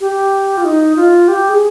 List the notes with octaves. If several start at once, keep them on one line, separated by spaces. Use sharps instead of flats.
G4
F4
D#4
F4
G4
G#4